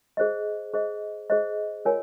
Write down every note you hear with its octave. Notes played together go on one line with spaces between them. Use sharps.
G#4 C5 D#5
G#4 C5 D#5
G#4 C5 D#5
F4 A#4 C#5 F5 G#5